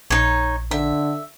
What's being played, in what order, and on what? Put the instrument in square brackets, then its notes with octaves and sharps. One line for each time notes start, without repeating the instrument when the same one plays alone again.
[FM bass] A#1 [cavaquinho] D#4 C#5
[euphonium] D3 [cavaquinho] E5